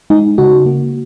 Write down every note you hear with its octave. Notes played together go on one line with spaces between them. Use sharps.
G#3 D#4
C#3 F#4
A#3